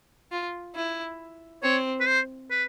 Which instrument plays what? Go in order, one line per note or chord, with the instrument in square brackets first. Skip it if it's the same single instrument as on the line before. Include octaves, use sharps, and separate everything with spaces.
[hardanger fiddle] F4
E4
[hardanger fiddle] C4 [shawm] C#5
[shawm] B4
C5
B4